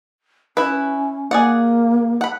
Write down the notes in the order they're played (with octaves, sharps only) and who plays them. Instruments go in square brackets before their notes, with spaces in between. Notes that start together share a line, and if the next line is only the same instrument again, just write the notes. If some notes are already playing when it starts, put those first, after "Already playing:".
[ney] C#4 [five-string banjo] E4 B4
[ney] A#3 [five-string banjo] G#4 D5 F#5
[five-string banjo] F#5 B5